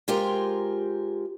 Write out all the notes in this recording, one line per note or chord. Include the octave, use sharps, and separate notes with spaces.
G#3 F4 G4 A#4 C5 A#5